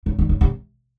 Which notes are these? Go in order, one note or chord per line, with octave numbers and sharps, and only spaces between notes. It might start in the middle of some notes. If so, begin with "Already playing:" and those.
C#3
D3
C#3
C3